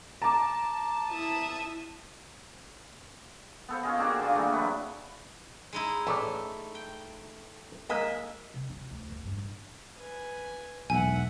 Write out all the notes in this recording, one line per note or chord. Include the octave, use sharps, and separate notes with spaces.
A5 A#5 D6
E4 E5 D#6
B3 A4 C5
C#4 F4 G#4 D#5
A#3 C4 D4 F#4
D3 A#3 F4
E3 G#3 A3
F#3 A3 B4
G#3 D#4 E4
A1 A3 C#5 D5
G5
G#3 A#3 D#5 E5
C3
F4
D2
E3
G2
A1
B4 G#5
E1 B1 E5 F#5 G#5